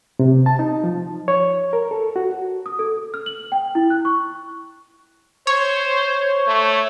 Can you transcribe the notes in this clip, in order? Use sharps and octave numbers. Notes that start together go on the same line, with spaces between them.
C3
A5
D#4
F3
C#5
A#4
A4
F#4
D#6
A4
F6
F#7
G5
E4
F#6
C#6
C5 C#5
A3